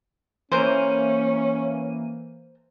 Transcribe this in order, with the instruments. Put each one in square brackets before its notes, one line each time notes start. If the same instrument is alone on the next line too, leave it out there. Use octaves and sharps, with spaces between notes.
[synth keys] E3 A#3 D#7 [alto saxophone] C#4 [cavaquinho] A#4 C5